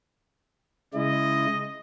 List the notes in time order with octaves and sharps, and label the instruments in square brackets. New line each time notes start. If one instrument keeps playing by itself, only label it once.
[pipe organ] C#3 G#3 E4 [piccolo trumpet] D#5